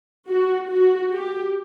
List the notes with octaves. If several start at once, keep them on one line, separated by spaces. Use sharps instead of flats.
F#4
F#4
G4